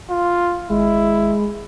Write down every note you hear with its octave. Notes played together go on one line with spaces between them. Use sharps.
F4
G#1 G#3 E4